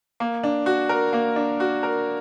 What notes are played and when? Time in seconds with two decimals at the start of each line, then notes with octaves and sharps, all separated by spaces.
0.20 A#3
0.43 D4
0.66 F#4
0.89 A#4
1.13 A#3
1.36 D4
1.60 F#4
1.83 A#4